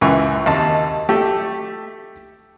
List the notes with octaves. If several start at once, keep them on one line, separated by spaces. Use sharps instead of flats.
C#2 F#2 E3 C#6
D#2 C3 A5
A3 G4 A4